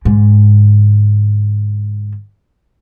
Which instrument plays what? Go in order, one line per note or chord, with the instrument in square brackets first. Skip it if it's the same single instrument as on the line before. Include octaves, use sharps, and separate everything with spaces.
[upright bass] G#2 D3